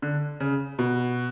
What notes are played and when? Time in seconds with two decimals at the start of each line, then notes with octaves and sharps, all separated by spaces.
0.02 D3
0.40 C#3
0.79 B2